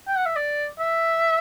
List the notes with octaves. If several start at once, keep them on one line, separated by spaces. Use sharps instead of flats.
G5
F#5
E5
D5
E5